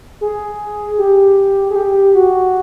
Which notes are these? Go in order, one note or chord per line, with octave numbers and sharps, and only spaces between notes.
G#4
G4
G#4
G4
F#4